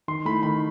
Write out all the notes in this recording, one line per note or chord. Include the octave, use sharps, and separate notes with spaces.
D#3 C6
A3 E4 B5
D#3 B5